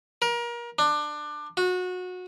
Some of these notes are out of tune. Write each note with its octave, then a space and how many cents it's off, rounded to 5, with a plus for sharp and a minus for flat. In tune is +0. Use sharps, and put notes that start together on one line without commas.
A#4 +30
D4 +20
F#4 -25